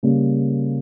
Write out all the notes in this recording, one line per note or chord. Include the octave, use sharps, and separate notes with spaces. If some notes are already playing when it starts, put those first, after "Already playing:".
C#3 G3 A#3